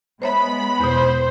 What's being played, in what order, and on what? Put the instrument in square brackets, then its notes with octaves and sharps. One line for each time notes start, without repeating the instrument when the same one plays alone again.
[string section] G#3 B3 B5 [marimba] C5 C#5 E5
[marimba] E2 B2 [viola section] C5